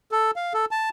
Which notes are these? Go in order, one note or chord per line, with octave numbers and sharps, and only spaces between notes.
A4
F5
A4
A5